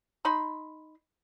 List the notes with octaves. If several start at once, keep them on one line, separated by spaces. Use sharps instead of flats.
D#4 B5 C6